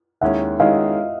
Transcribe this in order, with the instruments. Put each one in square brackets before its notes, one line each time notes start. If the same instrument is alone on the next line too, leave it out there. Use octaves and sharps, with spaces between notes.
[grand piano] D#2 D#3 G#3 C#4 E4 [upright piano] E5 F#5
[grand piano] D#3 G#3 C#4 E4 [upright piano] D#5 F5